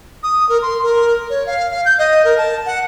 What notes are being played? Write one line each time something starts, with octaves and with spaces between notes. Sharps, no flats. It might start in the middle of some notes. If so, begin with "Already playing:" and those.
D#6
A#4
C6
A#4
C#5
F5
F5
G6
D#5
A#4
A5
F#5